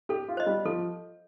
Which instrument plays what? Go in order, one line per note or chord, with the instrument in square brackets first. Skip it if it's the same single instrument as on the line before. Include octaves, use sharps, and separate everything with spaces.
[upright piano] G4 [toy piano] A4
[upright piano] F4
[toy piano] C5 D#5
[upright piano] G3
[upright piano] F3 [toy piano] A4